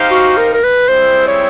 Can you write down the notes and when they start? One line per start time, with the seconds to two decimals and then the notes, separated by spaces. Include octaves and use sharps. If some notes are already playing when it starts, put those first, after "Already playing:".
Already playing: D#4 G4 C5 F5
0.11 F#4
0.37 A#4
0.54 A#4
0.64 B4
0.88 G3 C4 E4 G#4 C5
1.27 C#5